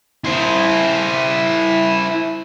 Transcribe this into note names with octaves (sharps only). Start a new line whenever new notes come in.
E4 C5